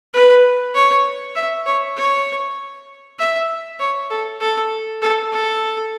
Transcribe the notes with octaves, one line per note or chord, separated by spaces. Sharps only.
B4
C#5
E5
C#5
C#5
E5
C#5
A4
A4
A4
A4